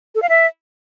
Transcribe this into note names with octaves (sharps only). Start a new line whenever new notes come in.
A4
F5
E5